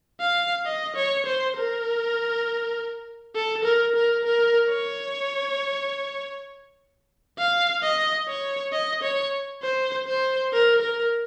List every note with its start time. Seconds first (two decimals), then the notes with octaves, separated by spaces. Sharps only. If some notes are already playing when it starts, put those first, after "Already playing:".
0.21 F5
0.66 D#5
0.96 C#5
1.26 C5
1.56 A#4
3.35 A4
3.64 A#4
3.95 A#4
4.24 A#4
4.69 C#5
7.39 F5
7.83 D#5
8.28 C#5
8.73 D#5
9.03 C#5
9.62 C5
10.07 C5
10.53 A#4
10.82 A#4